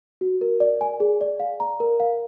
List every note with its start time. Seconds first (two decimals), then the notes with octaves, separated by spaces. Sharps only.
0.21 F#4
0.41 A#4
0.60 D5
0.81 G#5
1.00 G#4
1.21 D5
1.40 F5
1.60 A#5
1.80 A#4
2.00 F5